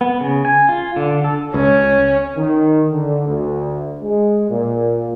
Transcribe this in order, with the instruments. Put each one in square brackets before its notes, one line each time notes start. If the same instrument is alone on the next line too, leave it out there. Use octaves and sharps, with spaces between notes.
[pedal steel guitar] B3
C#3
G#5
F4
D3
A4
[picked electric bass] C#2 [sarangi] C#4
[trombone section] D#3
D3
D2
G#3
A#2